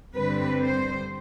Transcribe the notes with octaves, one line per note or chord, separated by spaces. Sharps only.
G2 D3 G3 C4 B4
C5